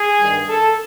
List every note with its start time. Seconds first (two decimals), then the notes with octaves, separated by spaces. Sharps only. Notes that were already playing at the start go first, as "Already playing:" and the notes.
Already playing: G#4
0.19 G2 D#3 G3
0.49 A4